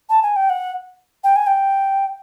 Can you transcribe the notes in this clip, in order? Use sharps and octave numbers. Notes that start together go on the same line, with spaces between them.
A5
G#5
G5
F#5
G5
G#5
G5